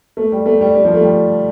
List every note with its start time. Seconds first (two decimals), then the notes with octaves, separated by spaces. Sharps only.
0.17 A3
0.32 G3
0.46 A3
0.61 G3
0.75 G3
0.85 F3
0.94 A3
1.04 G3